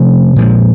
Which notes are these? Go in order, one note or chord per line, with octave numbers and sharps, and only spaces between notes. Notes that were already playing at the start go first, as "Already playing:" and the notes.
Already playing: C3 F3 A3 C#4
A#2 F3 G#3